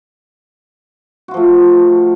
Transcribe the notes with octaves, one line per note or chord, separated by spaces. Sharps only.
F3 A3 F4 F#4